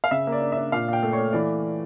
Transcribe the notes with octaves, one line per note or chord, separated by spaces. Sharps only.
F5
C#3 E5
A#3
D5
D4
D4 E5
A#2 F5
A#2 G5
A3
C#5
A3
E3 D5